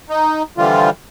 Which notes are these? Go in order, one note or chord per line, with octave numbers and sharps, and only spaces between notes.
D#4
D3 E3 F3 G3 F4